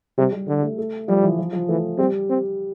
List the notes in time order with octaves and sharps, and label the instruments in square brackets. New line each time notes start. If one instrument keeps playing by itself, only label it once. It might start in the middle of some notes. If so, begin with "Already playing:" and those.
[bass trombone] C3 [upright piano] G3
[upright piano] G3
[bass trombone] D3 [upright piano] G3
[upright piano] A3
A3
[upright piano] F3 [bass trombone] G3
[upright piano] E3
F3
F3
[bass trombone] E3 [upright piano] A3
[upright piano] G3 [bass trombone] C4
[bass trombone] C4